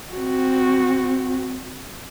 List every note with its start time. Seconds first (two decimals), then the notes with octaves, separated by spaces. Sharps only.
0.13 C4 F#4